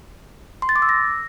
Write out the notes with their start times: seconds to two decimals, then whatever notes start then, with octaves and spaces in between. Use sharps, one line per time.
0.62 C6
0.69 A6
0.76 D6
0.82 E6
0.89 A#6